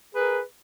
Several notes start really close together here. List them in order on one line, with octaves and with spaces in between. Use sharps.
G#4 B4 A#4